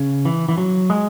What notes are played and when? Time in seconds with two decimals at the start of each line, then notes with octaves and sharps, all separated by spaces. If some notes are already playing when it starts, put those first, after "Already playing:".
Already playing: C#3
0.25 E3
0.49 E3
0.58 F#3
0.90 G#3